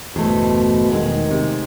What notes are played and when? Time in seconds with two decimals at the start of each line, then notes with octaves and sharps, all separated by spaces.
0.16 G1 E2 B2 A3 C5
0.92 E1 D#3 G#3
1.31 C3